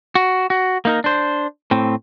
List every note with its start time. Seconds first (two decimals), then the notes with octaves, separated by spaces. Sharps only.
0.15 F#4
0.50 F#4
0.85 A#3 D#4 A#4
1.04 D4 C5
1.71 A2 C4